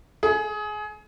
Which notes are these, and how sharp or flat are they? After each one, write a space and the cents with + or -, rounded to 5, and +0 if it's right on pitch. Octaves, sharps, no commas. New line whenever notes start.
G#4 +25